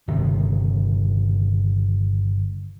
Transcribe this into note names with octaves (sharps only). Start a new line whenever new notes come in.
G1 C3 D#3